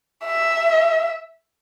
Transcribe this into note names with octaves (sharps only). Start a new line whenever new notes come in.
E5